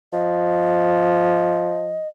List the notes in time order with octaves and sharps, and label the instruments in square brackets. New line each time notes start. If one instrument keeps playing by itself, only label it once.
[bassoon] F3 [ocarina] D#5